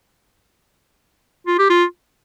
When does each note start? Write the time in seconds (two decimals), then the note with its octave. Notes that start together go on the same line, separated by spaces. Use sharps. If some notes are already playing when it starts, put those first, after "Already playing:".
1.47 F4
1.59 G4
1.70 F4